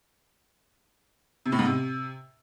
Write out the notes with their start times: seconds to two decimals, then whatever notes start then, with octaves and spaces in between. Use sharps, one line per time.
1.46 C3
1.52 A2
1.59 G#2
1.66 C3